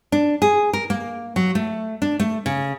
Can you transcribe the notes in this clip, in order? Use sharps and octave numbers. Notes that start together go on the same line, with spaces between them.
D4
G#4
A#4
A#3
F#3
A3
D4
A3
C#3